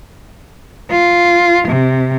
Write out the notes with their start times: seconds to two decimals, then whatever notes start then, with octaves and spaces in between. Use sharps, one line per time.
0.90 F4
1.68 C3